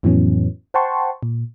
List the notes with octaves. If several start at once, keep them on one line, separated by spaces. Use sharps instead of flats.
F2 A2 E3 F#3 B3 C#4
C5 F#5 G5 A5 C6 C#6
A#2